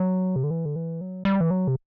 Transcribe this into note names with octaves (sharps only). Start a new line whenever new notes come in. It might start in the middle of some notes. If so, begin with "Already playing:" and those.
Already playing: F#3
C3
D3
E3
D3
E3
F#3
G3
E3
F#3
C3